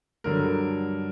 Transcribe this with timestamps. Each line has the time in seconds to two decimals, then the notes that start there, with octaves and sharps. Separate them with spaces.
0.24 G2 D3 F#3 A#4